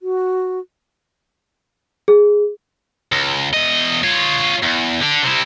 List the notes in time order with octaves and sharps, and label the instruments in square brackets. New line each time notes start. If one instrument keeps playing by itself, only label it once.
[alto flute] F#4
[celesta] G#4
[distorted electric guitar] C#2
E2 D#5
F4 C#5
E2
D3 D4
C3 E4